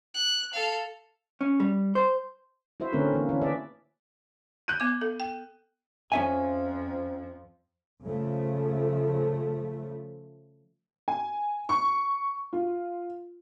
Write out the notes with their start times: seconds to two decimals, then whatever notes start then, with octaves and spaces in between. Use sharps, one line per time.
0.14 F#6
0.53 A4 F5
1.41 C#4
1.60 G3
1.95 C5
2.80 E4 F#4 C5 E5
2.93 D3 A3 C4 C#4 A#4 B4
3.13 E3 A#3
3.29 E3 C#4 D4 E4
3.41 G#4 B4 D5 E5
4.68 F#6 G6 D#7
4.80 B3 D6
5.01 A4
5.20 G5
6.12 F2 F3 C#4 E5 G#5
8.02 C#3 F3 A3
11.08 G#5
11.69 C#6
12.53 F4